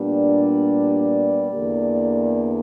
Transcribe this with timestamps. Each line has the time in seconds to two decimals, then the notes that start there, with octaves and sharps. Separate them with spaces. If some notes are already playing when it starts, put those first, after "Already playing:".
Already playing: A#2 G3 B3 D4
0.15 D5
1.52 E2 D3 A#3